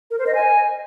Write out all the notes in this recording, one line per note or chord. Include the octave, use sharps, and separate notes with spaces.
A#4
C5
D#5
G#5